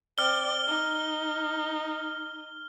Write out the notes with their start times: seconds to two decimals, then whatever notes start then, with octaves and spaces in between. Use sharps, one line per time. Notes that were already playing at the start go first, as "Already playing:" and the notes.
0.18 C4 D5 F6 G7
0.67 D#4